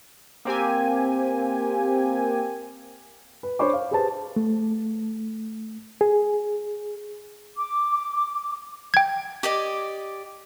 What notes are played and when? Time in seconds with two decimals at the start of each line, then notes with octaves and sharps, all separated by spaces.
0.45 A#3 C4 G4 G#5
3.43 B4
3.59 D4 C5 C#5 B5 C#6 D6
3.73 F5
3.91 G4 G#4 B4 C5 A5
4.36 A3
6.01 G#4
7.57 D6
8.94 G5 G#6
9.43 G4 D5 D#5